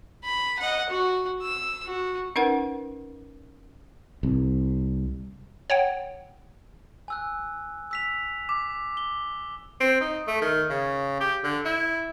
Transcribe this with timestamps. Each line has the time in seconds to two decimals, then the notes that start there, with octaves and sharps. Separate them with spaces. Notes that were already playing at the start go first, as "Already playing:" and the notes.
0.24 B5
0.59 D#5 F#5
0.90 F#4
1.42 E6
1.85 F#4
2.36 C#4 D#4 A#4 B4 F#5
4.23 C2
5.70 C#5 F#5 G5
7.08 G#5 E6 F#6
7.91 E6 B6 F7
8.49 D6
8.97 G7
9.80 C4
10.01 D#4
10.28 A3
10.41 D#3
10.70 C#3
11.20 G4
11.44 D3
11.65 E4